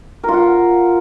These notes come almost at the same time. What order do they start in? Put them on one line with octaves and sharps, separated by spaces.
A#4 F4 F#5